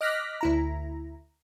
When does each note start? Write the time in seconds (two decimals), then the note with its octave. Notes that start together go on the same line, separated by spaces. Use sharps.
0.01 D#5 D6 F6 F#6 A#6 B6
0.41 D2 E4 A#5